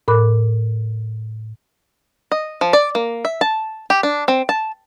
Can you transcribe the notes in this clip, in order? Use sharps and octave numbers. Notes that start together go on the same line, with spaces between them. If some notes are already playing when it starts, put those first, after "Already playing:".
A2 A#4 B5 D6 F#6
D#5
F3
D5
A#3
E5
A5
G4
D4
C4
A5